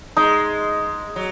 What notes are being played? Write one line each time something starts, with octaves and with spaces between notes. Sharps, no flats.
G#3 D#4
F#3